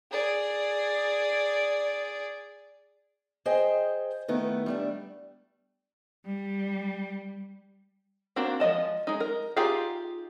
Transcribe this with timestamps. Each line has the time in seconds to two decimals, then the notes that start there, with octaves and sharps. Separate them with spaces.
0.11 G#4 D5
3.46 G#4 C5 D#5 G5
4.28 D#3 A3 B3 E4
4.66 G3 A3 D4
6.25 G3
8.36 A#3 C4 D4 F#4 A#4
8.60 F3 G#3 D#5 A5
9.07 G#3 D#4
9.20 A#4
9.56 D#4 F4 G4 G#4 F5